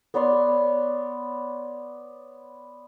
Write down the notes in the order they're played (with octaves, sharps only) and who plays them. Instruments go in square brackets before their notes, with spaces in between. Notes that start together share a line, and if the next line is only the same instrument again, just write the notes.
[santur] B3 C#5 D5 C6